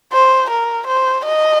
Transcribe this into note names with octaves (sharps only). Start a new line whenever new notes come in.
C5
A#4
C5
D#5